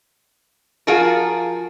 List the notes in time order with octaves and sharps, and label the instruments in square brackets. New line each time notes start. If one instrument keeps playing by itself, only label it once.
[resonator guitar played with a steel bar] F3 F4 F#4 G#4 A#4